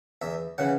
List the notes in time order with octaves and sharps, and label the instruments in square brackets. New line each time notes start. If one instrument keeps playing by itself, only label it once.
[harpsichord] E2 E5
C#3 E3 F#5